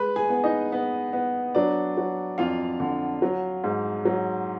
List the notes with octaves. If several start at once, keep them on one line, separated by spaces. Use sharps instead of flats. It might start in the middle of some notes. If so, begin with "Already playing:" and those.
Already playing: G#3 B4 B5
G#4 G#5
B3
D#4 D#5
B3
B3
F#3 D4 D5
F#3
F2 F4 F5
D3
F#3
G#2
F#3